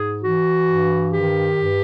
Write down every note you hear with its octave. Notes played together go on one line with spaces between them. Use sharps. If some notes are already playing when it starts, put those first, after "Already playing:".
Already playing: G#2 G#4
E3 F#4
G2
D#3 G4
G2